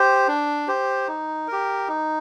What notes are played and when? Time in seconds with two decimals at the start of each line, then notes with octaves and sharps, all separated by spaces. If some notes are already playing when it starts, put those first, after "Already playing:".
Already playing: G4 C5
0.28 D4
0.68 G4 C5
1.08 D#4
1.48 G4 A#4
1.88 D#4